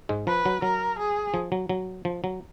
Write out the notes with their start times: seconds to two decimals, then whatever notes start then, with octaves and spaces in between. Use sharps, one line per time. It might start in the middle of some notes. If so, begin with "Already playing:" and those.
0.09 G#2 G#3
0.27 F3 B4
0.46 F#3
0.62 F#3 A#4
0.99 G#4
1.34 F3
1.52 F#3
1.69 F#3
2.05 F3
2.24 F#3